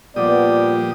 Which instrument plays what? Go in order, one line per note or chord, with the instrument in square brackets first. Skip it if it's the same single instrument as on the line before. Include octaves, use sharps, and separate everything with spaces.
[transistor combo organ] A#2 G4 D#6 [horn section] F3 G3 B3 [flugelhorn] D5